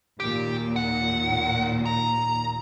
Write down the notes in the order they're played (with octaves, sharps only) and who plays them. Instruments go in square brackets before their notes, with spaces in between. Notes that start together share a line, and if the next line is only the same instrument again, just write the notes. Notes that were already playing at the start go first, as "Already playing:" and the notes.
[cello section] D#2 A#2 [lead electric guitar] G4
[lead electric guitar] F#5
A#5